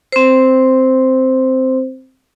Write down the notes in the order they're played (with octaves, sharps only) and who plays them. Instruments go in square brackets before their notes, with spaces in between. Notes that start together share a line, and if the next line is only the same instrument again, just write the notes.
[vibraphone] C4 C5